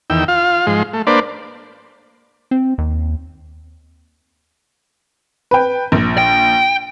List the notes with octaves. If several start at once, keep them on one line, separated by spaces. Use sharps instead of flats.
E2 D#3 G5 E6
F4 F5
G#2 F3 G#3 C6
A3
A#3 D4 B4 C5 D5
C4
D#2
B4 G5
A#1
G5